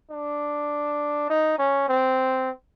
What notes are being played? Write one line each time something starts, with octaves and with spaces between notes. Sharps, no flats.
D4
D#4
C#4
C4